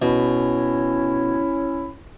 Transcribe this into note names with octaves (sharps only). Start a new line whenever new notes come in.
B2 C#4 E4